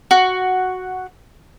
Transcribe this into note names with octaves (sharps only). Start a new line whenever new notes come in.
F#4